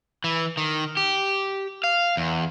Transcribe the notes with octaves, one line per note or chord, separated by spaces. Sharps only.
E3
D#3
G4
F5
E2